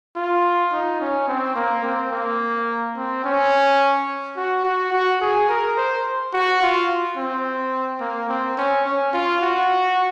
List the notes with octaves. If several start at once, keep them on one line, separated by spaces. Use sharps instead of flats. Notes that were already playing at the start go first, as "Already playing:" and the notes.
F4
D#4
C#4
C4
A#3
C4
A#3
C4
C#4
F#4
F#4
F#4
G#4
A#4
C5
F#4
F4
C4
A#3
C4
C#4
C#4
F4
F#4